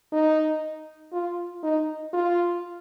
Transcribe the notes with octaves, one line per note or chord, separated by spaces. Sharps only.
D#4
F4
D#4
F4